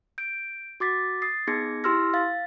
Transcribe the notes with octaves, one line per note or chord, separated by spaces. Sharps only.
G6 D7
F#4 D6 A6 B6
D#6 A6 C7
B3 D#4 G#4 G#6 A#6 C#7
E4 G4 C6 E6 F6 A#6
F5 A6